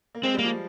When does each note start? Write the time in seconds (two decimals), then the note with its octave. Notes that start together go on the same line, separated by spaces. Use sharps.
0.15 A#3
0.23 G#3 C4
0.34 G3 A#3
0.44 F3